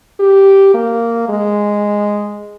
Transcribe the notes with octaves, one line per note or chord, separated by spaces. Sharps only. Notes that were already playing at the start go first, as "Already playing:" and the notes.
G4
A#3
G#3